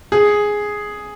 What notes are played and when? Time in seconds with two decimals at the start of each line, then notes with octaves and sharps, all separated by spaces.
0.12 G#4